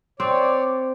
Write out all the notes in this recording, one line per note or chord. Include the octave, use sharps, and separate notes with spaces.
C4 C#5 D5